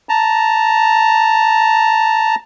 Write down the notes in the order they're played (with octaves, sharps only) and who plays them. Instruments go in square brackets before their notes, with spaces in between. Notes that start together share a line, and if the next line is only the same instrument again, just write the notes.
[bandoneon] A5 A#5